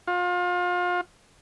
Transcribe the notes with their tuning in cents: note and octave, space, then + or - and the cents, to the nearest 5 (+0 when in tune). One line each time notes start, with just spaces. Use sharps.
F4 +35